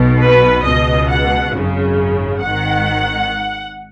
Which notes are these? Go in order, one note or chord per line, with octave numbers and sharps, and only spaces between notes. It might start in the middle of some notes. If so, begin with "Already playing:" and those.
Already playing: B1 B2
B4
C#2 B2 D#5
F#5
G#1 F#2 C#3
G#1 G#2 D#3 F#5